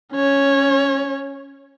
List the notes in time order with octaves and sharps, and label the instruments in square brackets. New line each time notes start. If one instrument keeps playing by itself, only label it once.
[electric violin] C#4 C#5